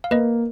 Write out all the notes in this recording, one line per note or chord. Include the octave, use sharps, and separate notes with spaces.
F5
A#3 B4 D#5